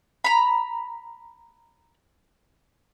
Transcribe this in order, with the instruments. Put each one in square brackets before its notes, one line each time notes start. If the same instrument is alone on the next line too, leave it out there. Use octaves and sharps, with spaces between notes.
[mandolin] A#5 B5